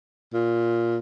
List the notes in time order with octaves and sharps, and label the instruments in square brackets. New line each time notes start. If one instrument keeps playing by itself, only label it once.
[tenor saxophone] A#2